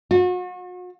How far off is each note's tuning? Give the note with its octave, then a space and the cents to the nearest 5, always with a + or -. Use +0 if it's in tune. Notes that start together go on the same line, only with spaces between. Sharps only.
F#4 -40